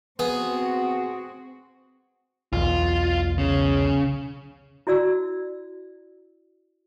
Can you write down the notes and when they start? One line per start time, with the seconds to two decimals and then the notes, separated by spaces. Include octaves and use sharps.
0.19 B3 C4 F#4 G#4
2.53 B1 E2 B2 F4
3.38 C#3
4.87 E4 F#4 D5 E6